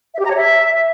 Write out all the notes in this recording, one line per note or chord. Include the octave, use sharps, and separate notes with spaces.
E5
G4
A#5
C#5
E5